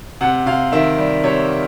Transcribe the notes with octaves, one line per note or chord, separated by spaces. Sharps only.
C3 F#5
C3 F5
D#3 E5
G3
C3 C#5